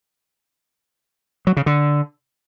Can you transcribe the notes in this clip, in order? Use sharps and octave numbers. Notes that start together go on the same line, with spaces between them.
F#3
C#3
D3